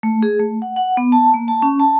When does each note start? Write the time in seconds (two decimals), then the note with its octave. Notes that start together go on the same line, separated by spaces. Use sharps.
0.03 A3
0.23 G#4
0.39 A3
0.62 F#5
0.76 F#5
0.97 B3
1.12 A5
1.34 A#3
1.48 A5
1.62 C#4
1.79 A5